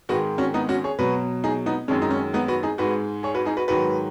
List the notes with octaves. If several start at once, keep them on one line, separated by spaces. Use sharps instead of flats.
G#2 D#3 G#3 F#4 B4
C#4 F#4
B3 D#4
C#4 F#4
G#4 C#5
B2 F#3 F#4 B4
D#4 G#4
B3 D#4
F#2 D#3 G#3 C#4
D#4
C#4
B3 D#4
F#4 B4
D#4 G#4
G#2 G#3 F#4 B4
G#4 C#5
F#4 B4
D#4 G#4
F#4 B4
G#2 D#3 F#3 F#4 B4